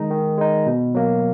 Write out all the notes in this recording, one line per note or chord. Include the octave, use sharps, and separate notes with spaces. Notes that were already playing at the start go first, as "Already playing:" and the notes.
Already playing: D#3 G#3 D#4
D#3
G#3 D#4
B2
F#3 A#3